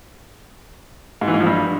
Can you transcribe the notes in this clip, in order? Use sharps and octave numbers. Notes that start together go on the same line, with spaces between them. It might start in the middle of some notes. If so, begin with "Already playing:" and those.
G#2
E3
G#2
F3
G2